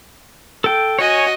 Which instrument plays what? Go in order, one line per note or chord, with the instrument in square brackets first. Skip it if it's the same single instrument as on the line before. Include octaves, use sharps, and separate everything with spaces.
[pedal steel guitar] A4 G5
[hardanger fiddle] F#4 D#5 [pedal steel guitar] C#5 G#5